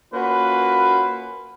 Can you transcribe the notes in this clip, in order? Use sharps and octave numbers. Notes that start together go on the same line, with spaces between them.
A#3 C#4 F4 F#4 B4